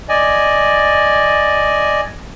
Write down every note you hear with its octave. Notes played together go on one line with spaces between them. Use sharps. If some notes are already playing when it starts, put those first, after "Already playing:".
D5 D#5 G#5